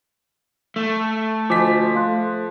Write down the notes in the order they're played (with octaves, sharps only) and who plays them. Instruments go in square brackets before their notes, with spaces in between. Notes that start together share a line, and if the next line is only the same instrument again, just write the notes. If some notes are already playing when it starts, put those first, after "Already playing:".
[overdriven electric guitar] A3
[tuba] D2 [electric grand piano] F3 B6 [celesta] D#5 G#5 D6
[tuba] A3 [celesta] F5 C6 F#6